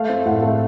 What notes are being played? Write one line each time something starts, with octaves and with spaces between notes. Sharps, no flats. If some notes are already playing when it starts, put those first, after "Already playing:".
Already playing: A3 F5
C4
A2 F#5
A3